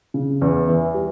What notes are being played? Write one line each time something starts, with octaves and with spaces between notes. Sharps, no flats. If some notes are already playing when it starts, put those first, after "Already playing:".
C#3
E2
E3
G3